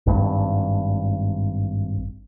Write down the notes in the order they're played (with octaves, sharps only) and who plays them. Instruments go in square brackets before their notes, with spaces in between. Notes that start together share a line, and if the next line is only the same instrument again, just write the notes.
[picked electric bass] G#1 G2